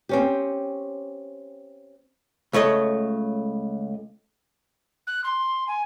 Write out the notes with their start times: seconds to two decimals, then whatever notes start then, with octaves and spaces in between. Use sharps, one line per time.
0.09 C4 C#4 G4
2.53 C#2 A3 C#5 D#5
5.07 F#6
5.24 C6
5.68 G#5